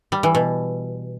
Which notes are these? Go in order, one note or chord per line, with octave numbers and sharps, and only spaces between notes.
G3
E3
B2